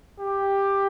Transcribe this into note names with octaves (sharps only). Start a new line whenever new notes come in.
G4